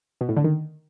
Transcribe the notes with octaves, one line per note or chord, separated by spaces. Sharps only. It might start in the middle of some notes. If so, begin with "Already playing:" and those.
B2
A2
D3
D#3